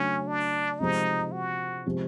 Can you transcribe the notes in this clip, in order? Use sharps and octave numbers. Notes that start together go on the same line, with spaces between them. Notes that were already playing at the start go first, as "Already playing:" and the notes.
Already playing: C#3 F#3 A3 C#4 D4
D4
C3 F3 G#3 D#4
F#4
C3 F3 G#3